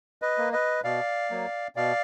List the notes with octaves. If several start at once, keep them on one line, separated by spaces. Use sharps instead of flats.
B4 D#5
A#3
B4 D#5
B2 D5 F5
F#3 A#3
B2 D5 F5